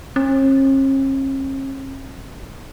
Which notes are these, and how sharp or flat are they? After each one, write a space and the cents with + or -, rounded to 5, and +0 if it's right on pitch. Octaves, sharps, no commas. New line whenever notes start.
C#4 -45